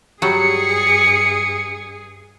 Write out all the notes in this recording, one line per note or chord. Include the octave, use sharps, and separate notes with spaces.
G2 F#3 G3 G#4 C#7